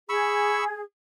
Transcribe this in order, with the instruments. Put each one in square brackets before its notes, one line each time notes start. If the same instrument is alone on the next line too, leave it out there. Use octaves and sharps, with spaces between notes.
[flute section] G#4 [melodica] B5 C#6 E6